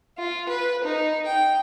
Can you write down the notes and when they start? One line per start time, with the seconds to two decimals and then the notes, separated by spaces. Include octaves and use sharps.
0.18 F4
0.48 B4
0.84 D#4
1.26 G5